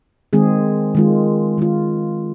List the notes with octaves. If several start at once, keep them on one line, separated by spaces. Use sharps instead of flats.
D#3 G#3 C4 G#4
D#3 G#3 F4
D#3 G#3 F4